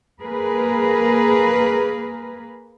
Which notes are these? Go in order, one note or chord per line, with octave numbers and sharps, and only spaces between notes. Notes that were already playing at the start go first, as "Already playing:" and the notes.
A#3 G#4 A#4 B4